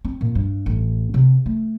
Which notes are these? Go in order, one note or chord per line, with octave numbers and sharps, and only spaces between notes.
C4
A#2
G2
A1
C3
A3